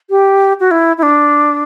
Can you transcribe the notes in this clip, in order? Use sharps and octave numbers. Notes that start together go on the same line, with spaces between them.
G4
F#4
E4
E4
D4